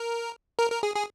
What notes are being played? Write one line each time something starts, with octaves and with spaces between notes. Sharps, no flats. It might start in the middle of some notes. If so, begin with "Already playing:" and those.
Already playing: A#4
A#4
A#4
G#4
G#4